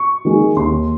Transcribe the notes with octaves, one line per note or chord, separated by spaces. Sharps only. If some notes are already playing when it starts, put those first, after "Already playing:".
Already playing: C#6
D#3 G#3
D#2 C6